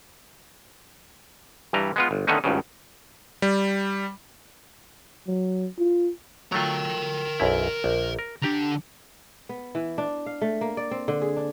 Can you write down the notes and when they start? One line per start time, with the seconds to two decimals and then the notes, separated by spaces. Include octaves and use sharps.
1.73 G2 E3 G3 A#5
1.96 G#3 B3 F4
2.11 G1
2.27 D3 D#3 A3 B3 C#4 D#4
2.44 G#1 C#2 G2 C#3
3.42 G3
5.27 F#3
5.79 F4
6.52 F#3 A3 F4 A#4 G5
7.40 B1 F#2 E4
7.84 A#1
8.19 A#4
8.42 D3 D4 G4 A#5
9.49 B3
9.75 E3
9.98 D4
10.26 F5
10.42 A3
10.61 A#3
10.77 D5
10.91 C4
11.08 D3
11.22 G#4
11.36 D4